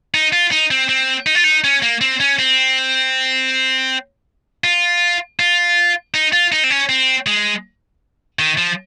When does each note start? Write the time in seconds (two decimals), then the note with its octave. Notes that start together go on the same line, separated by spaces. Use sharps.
0.14 D#4
0.33 F4
0.51 D#4
0.71 C4
0.89 C4
1.26 D#4
1.35 F4
1.44 D#4
1.64 C#4
1.82 A#3
2.01 C4
2.20 C#4
2.39 C4
4.64 F4
5.39 F4
6.14 D#4
6.33 F4
6.52 D#4
6.64 C4
6.70 C#4
6.89 C4
7.27 G#3
8.39 D#3
8.58 F3